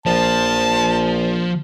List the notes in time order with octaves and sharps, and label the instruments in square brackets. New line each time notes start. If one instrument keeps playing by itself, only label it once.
[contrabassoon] A#1 [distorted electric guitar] F3 [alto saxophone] A5